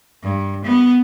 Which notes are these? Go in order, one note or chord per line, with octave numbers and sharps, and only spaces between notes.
G2
B3